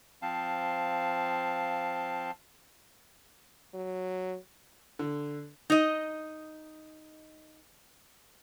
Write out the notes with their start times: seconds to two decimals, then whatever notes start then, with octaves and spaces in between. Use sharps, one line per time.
0.22 F3 C4 F5 A5
3.74 F#3
4.99 D3
5.70 D#4 D#5